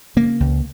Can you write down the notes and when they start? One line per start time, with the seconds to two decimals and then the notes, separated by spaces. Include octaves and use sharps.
0.16 C#3 A#3
0.40 C#2